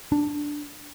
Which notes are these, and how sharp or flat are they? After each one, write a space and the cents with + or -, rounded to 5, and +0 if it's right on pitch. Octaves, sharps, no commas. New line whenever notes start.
D4 +0